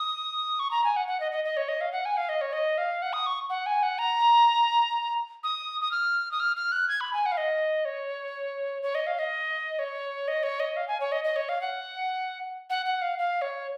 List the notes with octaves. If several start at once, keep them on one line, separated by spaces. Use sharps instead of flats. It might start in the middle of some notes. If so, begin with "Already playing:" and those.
Already playing: D#6
C#6
A#5
G#5
F#5
F#5
D#5
D#5
D#5
C#5
D#5
F5
F#5
G#5
F5
D#5
C#5
D#5
F5
F#5
D#6
C#6
F#5
G#5
F#5
A#5
D#6
D#6
F6
D#6
F6
F6
F#6
G#6
B5
G#5
F#5
F5
D#5
C#5
C#5
D#5
F5
D#5
C#5
D#5
C#5
D#5
F5
G#5
C#5
D#5
D#5
C#5
F5
F#5
F#5
F#5
F5
F5
C#5